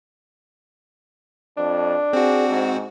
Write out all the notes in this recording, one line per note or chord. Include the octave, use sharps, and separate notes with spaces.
F2 D4
C4 F#4 G#4
G#2